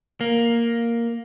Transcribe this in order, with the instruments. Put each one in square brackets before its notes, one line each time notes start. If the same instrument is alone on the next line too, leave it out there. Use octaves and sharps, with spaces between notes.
[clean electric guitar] A#3